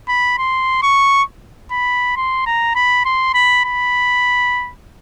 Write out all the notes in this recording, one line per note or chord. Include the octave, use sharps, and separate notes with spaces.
B5
C6
C#6
B5
C6
A#5
B5
C6
B5
B5